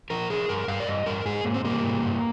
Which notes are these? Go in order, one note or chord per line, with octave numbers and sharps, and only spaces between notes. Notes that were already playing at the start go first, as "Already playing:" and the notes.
F3 A#4
F3 G#4
G2 A#4
G2 F5
D5
G2 D#5
G2 A#4
G#2 G#4
G#2 A#3
C4
G3 A#3
G#2
G2